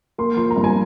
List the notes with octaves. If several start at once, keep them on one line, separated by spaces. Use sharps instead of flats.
A#3 C6
F3 C6
A#5
G2
G#5